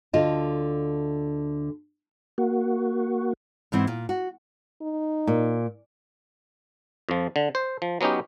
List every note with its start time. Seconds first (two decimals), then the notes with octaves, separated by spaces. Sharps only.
0.13 D2 D3 F4 D#5 A5
2.38 A#3 F#4
3.72 G#2 E3 C4 E4 F#5
3.87 A#2
4.09 F#4
4.82 D#4
5.27 A#2
7.09 F2 F3
7.36 D3
7.55 C5
7.82 F3
8.01 F#3 B3 C#4 D#4 G4